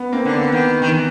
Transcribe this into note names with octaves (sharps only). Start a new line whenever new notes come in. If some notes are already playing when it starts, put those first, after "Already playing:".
Already playing: B3
A#3 C4
D3
B3
D#3 B3
D#3
E3